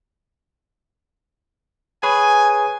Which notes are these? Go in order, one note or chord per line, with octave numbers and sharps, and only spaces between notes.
G#4 B4 C#5 G#5